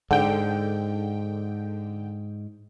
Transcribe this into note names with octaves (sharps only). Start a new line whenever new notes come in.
G#2 D3 G5